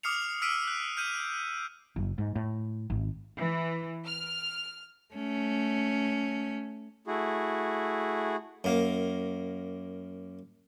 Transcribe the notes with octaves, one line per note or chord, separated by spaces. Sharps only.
D6 D#6 F6 C7 C#7 F7
E6 F6 B6 D7 D#7
F#6
F6 G6 D#7
F#1
G#2
A2
G#1
E3
F6
A3 C#4
A3 E4 F#4 G#4
F#2 A#3